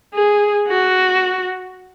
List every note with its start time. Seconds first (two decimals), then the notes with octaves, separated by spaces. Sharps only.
0.14 G#4
0.68 F#4